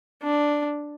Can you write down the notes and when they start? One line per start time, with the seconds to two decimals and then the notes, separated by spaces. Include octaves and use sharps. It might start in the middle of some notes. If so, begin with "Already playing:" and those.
0.23 D4